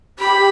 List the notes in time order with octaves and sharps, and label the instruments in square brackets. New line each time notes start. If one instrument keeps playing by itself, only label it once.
[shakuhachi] G4 [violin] B5